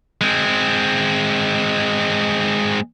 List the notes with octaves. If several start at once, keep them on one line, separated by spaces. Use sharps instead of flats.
G#3 C4